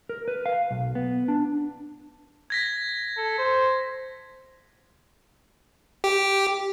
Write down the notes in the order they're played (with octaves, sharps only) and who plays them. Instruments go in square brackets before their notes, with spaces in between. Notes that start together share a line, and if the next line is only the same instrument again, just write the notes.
[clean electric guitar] A#4
B4
F5
B1
B3
D4
[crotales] G#6 A#6 B6
[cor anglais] A4
C5
[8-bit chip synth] G4